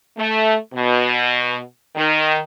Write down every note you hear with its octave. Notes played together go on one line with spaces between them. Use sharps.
A3
B2
D#3